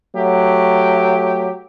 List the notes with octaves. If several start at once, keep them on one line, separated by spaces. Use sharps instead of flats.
F#3 A3 G4